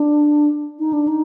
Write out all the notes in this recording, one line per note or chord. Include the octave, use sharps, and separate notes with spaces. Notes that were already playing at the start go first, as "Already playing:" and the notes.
Already playing: D4
D#4
D4
D#4